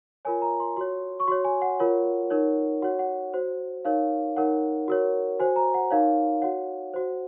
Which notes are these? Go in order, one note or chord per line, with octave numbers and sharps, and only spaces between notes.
F4 A#4 C#5 G#5
A#5
C6
F#4 C#5 C6
C#6
F#4 C#5 C6
G#5
F#5
F4 A#4 C#5
D#4 A#4 C#5
F#4 C#5 F#5
F#5
F#4 C5
D#4 A#4 C#5 F5
D#4 A#4 C#5 F#5
F#4 A#4 C#5
F#4 C5 G#5
A#5
F#5
D#4 A#4 C#5 F5
F#4 C#5 F#5
F#4 C5